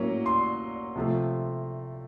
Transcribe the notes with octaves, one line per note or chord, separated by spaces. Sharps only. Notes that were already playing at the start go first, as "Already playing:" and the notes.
Already playing: A2 F#3 A#3 C#4
C6
C3 F3 A3